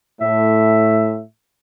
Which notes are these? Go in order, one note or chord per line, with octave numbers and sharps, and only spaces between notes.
A2 E5